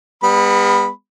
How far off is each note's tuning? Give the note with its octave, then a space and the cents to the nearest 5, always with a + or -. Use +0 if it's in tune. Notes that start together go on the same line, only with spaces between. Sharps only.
G3 +45 B3 +5 B5 -5